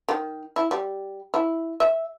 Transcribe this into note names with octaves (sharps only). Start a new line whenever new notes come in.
D#3
E4
G3
E4
E5